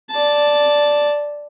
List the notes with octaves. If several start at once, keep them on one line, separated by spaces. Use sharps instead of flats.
D5 A5